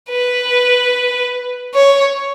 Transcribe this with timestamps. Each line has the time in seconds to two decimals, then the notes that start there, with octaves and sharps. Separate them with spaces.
0.10 B4
1.74 C#5